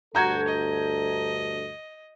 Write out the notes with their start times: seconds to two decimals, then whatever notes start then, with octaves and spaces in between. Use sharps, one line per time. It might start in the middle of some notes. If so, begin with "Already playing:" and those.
0.15 D2 G2 F#4 A4 A#5 G6 G#6
0.48 D#5